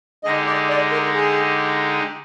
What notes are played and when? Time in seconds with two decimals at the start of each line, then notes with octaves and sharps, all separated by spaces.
0.24 D3 G#3 D#4 G4 D#5
0.46 D5
0.69 D5
0.91 A#4
1.14 G#4